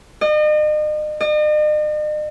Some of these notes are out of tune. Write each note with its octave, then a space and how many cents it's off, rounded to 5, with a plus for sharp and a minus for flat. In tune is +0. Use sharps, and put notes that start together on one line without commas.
D#5 -40
D#5 -45